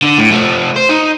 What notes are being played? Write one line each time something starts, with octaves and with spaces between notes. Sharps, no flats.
D3
A2
F3 A3
C5
D#4